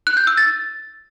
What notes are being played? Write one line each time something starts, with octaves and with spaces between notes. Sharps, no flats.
F#6
G6
E6
A6